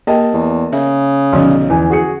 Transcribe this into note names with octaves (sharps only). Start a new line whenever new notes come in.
A#3 G4 A#4 D#5 G5 A5
E2
C#3 E5
B1 D3 F3 C#4
E2 E3 G#5
F#4 G#4 C#7